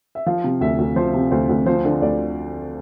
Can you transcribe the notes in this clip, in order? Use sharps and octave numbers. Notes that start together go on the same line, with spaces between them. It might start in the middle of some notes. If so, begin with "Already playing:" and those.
E5
F3 F5
C3
D2 E5
D2
F3 C5
C3
D2 C5
D2
F3 C5
D3
D2 D5